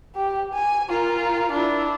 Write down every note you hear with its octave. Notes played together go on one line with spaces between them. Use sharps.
G4
G#5
F4 A#4
D4 E4